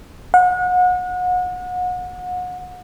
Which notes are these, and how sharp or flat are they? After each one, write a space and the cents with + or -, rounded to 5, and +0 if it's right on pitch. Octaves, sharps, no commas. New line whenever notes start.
F#5 -35